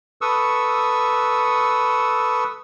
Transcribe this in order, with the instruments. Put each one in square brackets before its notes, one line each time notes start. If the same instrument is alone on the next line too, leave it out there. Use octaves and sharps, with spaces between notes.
[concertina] A4 B4 C#6 D#6 E6